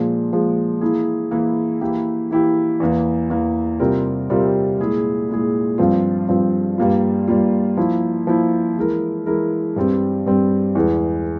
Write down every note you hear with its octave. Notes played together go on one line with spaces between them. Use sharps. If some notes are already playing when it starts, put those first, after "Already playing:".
Already playing: A#2 F3 G#3
A#2 F3 G#3
E3 A#3 E4 G#4
E3 A#3 E4 G#4
E3 A#3 E4 G4
E3 A#3 E4 G4
E2 E3 A#3
E2 E3 A#3
C3 G3 C4 F4 A#4
C3 G3 C4 F4 A#4
A#2 G#3 E4 G#4
A#2 G#3 E4 G#4
G2 F3 C4 F4
G2 F3 C4 F4
G2 G3 A#3 F4
G2 G3 A#3 F4
F3 A#3 E4
F3 A#3 E4
E3 G#3 E4 A#4
E3 G#3 E4 A#4
G2 G3 C4
G2 G3 C4
E2 E3 G#3